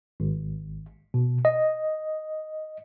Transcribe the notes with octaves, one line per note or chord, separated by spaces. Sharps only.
G#1
B2
D#5